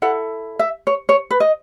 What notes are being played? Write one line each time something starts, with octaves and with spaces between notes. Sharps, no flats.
E4 A4 F#5
E5
C#5
C#5
B4
D#5